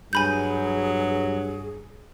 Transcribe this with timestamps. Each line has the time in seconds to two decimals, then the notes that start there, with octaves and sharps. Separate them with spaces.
0.13 G2 F#3 G#4 G#5 B5 G6